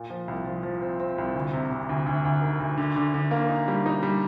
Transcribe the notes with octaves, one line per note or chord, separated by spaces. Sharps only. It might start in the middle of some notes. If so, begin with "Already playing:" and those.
Already playing: A#2
F3
C2
F3
F3
C4
C4
C2
D2
C3
C3
D2
D2
D2
D#3
D2
D3
D3
D3
A#3
D#4
G3
D#4
G3